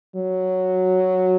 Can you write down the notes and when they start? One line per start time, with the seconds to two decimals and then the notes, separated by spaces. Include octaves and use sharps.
0.16 F#3